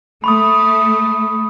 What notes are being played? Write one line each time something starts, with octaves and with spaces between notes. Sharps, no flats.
A3 B5 C#6 D#6